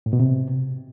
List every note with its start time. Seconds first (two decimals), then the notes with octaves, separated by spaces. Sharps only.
0.06 A2
0.13 B2
0.20 C3